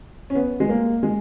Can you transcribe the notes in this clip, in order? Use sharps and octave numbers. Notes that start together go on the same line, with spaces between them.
C#4
B3
G#3
A#3
G#3